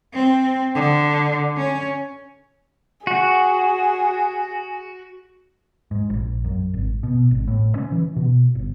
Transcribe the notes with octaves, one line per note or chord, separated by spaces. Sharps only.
C4
D3
C#4
F#4 G#4
G#2
A#1
F#2
G#1
B2
G#1
A2
C#4
E3
B2
G1